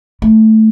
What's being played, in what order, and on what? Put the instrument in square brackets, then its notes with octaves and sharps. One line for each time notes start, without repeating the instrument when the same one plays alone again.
[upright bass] A3